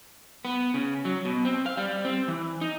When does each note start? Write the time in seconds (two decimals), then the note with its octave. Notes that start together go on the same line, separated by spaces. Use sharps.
0.45 B3
0.74 C#3
1.05 F#3
1.25 B2
1.45 C4
1.66 F5
1.77 G3
2.05 C4
2.28 E3
2.61 D#4